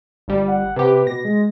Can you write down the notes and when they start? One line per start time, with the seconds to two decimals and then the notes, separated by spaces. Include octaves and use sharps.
0.28 G1 G3
0.48 F#5
0.76 C3 G4 B4
1.07 B2 A#6
1.25 G#3